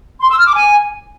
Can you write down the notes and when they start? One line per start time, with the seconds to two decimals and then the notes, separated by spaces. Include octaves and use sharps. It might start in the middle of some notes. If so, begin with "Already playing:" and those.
0.22 C6
0.30 E6
0.38 F6
0.47 D6
0.55 G#5